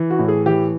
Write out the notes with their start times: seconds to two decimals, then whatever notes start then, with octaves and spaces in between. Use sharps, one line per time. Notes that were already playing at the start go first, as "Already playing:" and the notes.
Already playing: E3
0.10 F#4
0.19 A2
0.28 G#4
0.46 E3 G4